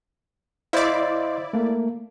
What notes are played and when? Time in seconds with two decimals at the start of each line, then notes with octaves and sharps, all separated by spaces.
0.73 E4 C5 D5 D#5 F5
1.53 A3 A#3